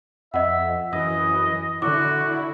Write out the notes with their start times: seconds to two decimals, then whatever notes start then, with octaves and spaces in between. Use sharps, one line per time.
0.34 F2 D#5 E5 F#5
0.93 F#2 E3 D#5 D#6
1.82 D3 E4 F#4 D6